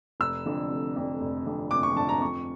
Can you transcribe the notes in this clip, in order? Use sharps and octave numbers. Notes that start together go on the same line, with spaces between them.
F1 E6
F2 D3
F1
F2 D3
F1
F2 D3
F1 D6
C#6
F2 D3 A5
A#5
F2 C#6